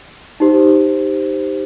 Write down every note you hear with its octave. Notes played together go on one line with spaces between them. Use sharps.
D#4 G4 C5